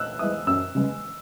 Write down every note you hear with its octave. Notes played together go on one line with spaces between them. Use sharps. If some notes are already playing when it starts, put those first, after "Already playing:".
Already playing: E6 F#6
G#3 B3 E4 D#6
F#2 E6
C#3 G#3 B3